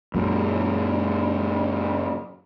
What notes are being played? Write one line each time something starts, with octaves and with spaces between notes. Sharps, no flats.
F#2 A#2